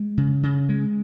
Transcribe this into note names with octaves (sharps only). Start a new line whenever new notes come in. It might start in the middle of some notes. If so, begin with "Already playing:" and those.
Already playing: G#3
C#3
C#3
G#3